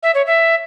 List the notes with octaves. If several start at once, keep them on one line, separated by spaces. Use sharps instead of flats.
E5
C#5
E5